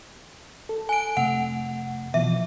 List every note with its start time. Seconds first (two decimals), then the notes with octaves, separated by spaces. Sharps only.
0.69 A4
0.89 G#5 D7
1.17 F2 C3 A3 F#5
2.14 B2 E3 F3 E5